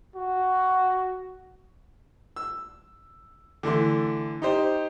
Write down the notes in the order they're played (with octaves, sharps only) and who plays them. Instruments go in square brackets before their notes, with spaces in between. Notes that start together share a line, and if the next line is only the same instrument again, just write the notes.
[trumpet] F#4
[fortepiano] E6
D3 E3 A3 C6
D#4 G4 C5